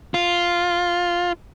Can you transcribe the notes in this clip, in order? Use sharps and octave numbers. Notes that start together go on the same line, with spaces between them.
F4